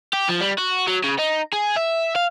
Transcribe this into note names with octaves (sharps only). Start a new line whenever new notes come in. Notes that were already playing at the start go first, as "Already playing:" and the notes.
G4
F3
G3
F#4
F#3
C#3
D#4
G#4
E5
F5